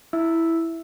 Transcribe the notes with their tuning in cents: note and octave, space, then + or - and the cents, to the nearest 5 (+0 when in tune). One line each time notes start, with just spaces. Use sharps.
E4 +0 E5 +0 E6 +0